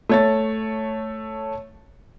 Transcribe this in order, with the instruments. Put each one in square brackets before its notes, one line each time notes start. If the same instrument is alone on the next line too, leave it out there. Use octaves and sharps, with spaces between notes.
[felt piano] A3 C#5 A6